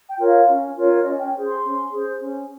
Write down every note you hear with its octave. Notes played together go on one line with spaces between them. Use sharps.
G5
F4 A#4 C#5
F5
C#4
F4 A#4 C#5
C#4 D#5
G5
G#4 C5
C6
C#4
G#4 C5
C#4